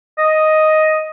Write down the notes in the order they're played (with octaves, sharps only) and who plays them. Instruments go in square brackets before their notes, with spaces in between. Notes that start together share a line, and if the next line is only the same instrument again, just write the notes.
[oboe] D#5